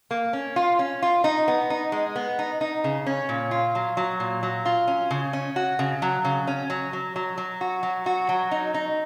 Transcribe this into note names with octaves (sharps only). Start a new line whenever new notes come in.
A#3
C#4
F4
C#4
F4
D#4
B3
D#4
G#3
B3
D#4
D#4
C#3
C#4
A#2
F4
F#3
F#3
A#2
F#3
F4
C#4
C#3
C#4
F#4
C#3
F#3
C#3
C#4
F#3
F#3
F#3
F#3
F#4
F#3
F#4
F#3
D#4
D#4